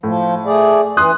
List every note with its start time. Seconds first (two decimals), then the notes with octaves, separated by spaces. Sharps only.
0.03 A2 F3
0.45 A3 G#4 D5
0.97 E3 C6 D#6 F#6